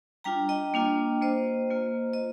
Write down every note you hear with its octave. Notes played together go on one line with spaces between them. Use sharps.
G3 D4 F4 G5 A#5
D#5 G5
A#3 D4 F4
A#3 F4 C5 D#5
A#3 F4
D#5